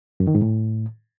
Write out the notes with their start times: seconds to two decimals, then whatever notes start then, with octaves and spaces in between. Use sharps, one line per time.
0.20 F#2
0.27 D#3
0.35 G#2
0.42 A2